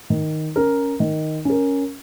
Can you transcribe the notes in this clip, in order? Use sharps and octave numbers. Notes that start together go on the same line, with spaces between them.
D#3
C#4 A#4
D#3
C#4 A#4